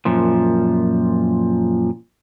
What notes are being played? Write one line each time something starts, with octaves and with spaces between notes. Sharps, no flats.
F#2 A#2 F3